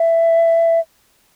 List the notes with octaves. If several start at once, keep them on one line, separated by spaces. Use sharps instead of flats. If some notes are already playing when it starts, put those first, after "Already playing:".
Already playing: E5